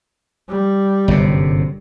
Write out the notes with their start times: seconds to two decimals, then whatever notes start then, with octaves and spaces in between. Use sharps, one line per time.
0.49 G3
1.08 G1 F#2 C3